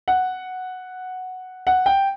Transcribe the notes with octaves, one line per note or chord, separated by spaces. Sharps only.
F#5
F#5
G5